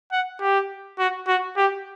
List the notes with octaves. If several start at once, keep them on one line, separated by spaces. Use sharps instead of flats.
F#5
G4
F#4
F#4
G4